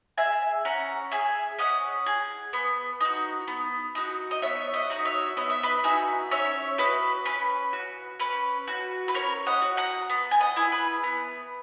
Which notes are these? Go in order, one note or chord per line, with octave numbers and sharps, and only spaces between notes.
G#4 E5 G#5
C#4 F#5 A#5
G#4 E5 G#5
C#4 D#5 F#5
G#4
B3
D#4 F#4
B3
D#4 F#4
D#5
B3 C#5 E5
D#5 F#5
D#4 F#4
C#5 E5
B3 D#5
E5
B4 D#5
D#4 F#4 E5 G#5
C#4 C#5 E5
F#4 B4 D#5
C#4 B4
F#4
C#4 B4
F#4
B4
C#4 A#4 C#5
D#5 F#5
F#4
F#5 A#5
B3
G#5
D#5 F#5
E4 G#4
B4
B3